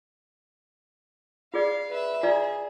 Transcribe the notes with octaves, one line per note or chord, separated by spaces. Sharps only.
F4 G#4 D5 F5
B4 E5
F4 G#4 D5 A#5